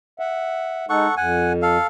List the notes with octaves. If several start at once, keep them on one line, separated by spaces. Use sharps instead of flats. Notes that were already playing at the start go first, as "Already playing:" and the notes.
E5 F#5
G#3 D#4 A4 F#5 C#6
F2 F#5 G#5
A4 F5